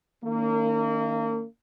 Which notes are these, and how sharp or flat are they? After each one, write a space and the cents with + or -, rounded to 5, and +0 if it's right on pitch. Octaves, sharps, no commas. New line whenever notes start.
D#3 +0 A#3 -30 C#4 +35